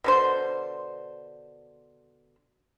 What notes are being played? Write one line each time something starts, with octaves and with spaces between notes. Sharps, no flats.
B2 D3 C5